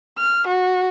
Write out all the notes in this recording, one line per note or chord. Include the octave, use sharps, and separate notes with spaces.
F6
F#4